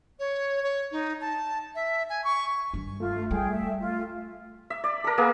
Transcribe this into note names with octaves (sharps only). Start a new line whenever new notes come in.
C#5
C#5
D#4
A5
E5
G#5
C#6
G2 D#3
A3 F4
G3 G#4 G5
E5
F4
E5
D5
A4 A#4
A#3 B3 G#4 A#4